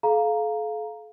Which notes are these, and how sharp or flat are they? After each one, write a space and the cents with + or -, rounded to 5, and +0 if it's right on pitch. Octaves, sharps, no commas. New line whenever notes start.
A4 -40 F5 +0 A#5 +0